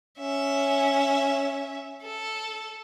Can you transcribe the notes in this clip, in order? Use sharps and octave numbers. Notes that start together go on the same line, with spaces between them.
C#4 E5
A4